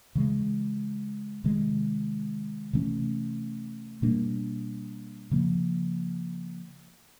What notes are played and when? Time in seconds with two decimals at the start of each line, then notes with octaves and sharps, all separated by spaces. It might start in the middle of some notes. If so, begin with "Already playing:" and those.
0.15 C#3 E3 G#3
1.44 C3 D#3 G#3
2.73 C3 E3 A3 C#4
4.02 B2 G3 A#3 D4
5.31 C#3 F3 A#3